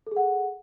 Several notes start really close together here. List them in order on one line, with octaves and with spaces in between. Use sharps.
A4 G#4 F#5